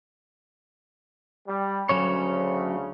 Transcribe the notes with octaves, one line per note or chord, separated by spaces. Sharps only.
G3
D2 C#3 F#3 C#4 C#5